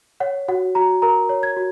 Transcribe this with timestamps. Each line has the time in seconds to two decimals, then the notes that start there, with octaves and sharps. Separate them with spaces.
0.20 C#5 F#5
0.48 F#4 F#5
0.75 F#4 A#5
1.02 A#4 A#5
1.29 C#5
1.43 G#6
1.57 F#4